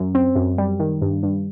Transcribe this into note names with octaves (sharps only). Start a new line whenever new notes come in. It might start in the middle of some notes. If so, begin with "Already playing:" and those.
Already playing: F#2
C4
F#2
G3
D#3
G2
G2